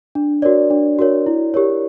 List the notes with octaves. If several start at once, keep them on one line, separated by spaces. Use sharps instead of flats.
D4
F#4 A#4 C#5 D5
D4
F#4 A#4 C#5
E4
G4 A#4 C#5